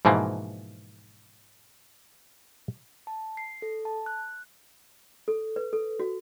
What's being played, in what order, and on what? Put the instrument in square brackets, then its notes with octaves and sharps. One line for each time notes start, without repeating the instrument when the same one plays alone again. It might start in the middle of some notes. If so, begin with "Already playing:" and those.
[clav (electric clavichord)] G#2 B2 E3 F3 A#3
[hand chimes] A5
C7
A4
A5
F#6
[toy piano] A4
B4
A4
F#4